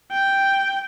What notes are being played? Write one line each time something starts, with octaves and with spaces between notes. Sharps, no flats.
G5